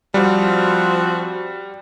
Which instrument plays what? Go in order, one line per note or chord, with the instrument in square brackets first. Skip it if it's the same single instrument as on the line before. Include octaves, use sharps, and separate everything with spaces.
[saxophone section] F3 C4 F#4 [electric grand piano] G3